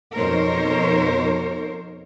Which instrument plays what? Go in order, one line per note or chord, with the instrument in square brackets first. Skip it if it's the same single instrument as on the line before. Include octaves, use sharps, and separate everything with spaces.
[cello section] F2 B2 D#4 A#4 C5 C#5